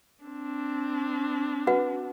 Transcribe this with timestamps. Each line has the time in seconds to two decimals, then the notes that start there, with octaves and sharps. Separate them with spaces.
0.24 C4 D4
1.67 F#4 B4 F#5